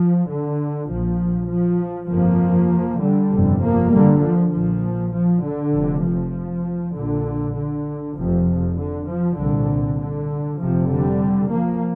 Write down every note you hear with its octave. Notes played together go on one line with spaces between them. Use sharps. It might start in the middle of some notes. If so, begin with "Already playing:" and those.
Already playing: F3
D3
A#1 A#2 F3
F3
G1 F2 C3 F3 A#3
D3 G3
G1 F2 C3
F3 A#3
D3 G3
F3
A#1 A#2 F3
F3
D3
F1 F2 C3
F3
A#1 A#2 D3
D3
F1 F2 C3 F3
D3
F3
C2 A#2 D3
D3
F1 F2 C3 F3
D3 G3
F3 A#3